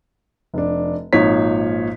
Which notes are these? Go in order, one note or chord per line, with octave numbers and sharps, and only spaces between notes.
F1 D4
G#1 A#2 F3 D#4 C#5 B6